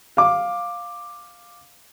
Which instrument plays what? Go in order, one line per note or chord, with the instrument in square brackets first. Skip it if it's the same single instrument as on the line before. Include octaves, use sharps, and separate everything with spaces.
[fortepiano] F5 D6